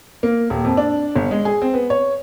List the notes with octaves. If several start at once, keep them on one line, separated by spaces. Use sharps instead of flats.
A#3
D#1
F2
D4
G1
G#3
G#4
C4
B3
C#5